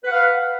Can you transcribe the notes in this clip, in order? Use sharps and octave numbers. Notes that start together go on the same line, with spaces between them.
B4 F5 F#5